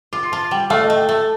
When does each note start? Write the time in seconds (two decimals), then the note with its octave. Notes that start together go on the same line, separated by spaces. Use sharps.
0.13 F4 D6
0.23 C6
0.32 F4 A5
0.51 G3 G5
0.70 A3 F5
0.84 D#5
0.90 A3
0.96 G5
1.09 A3 A5